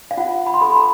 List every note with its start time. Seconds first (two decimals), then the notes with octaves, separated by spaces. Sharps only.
0.11 F5
0.17 F4 F#5
0.46 B5
0.54 C6
0.61 A4 B5
0.76 A#5